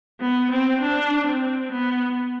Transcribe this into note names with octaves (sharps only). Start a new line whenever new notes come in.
B3
C4
D4
C4
B3